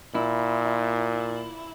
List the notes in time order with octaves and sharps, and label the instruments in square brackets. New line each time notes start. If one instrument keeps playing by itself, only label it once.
[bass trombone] A#2 [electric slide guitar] E4